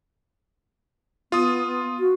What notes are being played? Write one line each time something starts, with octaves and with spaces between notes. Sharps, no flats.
B3 F4 D#6
F#4